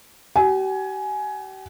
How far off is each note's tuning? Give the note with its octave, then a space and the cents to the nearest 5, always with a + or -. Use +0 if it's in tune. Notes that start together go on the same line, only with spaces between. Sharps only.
G4 -45 G#5 +15